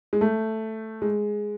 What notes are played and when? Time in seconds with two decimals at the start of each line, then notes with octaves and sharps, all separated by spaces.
0.13 G#3
0.21 A3
1.02 G#3